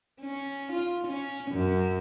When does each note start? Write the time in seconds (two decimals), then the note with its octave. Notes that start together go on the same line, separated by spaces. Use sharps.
0.22 C#4
0.73 F4
1.08 C#4
1.52 F#2